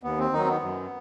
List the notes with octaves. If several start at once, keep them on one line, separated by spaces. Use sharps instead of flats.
D#2 B3
C4
D#3 F#3 D#4
C4
B3
F#2